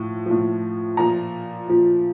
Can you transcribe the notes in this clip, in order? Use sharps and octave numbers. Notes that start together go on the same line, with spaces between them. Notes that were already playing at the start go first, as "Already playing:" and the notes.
Already playing: A2 F3
F3
A2
A#2 F3 A#5
A#2 F3